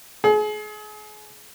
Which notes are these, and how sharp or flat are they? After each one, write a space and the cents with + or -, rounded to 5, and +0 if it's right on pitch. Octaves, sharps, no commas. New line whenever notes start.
G#4 +35